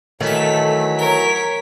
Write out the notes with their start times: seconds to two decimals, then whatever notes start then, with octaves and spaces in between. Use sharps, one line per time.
0.20 D#3 E3 F#3 A3 B6
0.98 A#4 C#5 B6